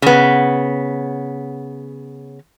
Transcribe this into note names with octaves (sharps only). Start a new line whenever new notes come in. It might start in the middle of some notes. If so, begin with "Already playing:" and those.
C#3 B3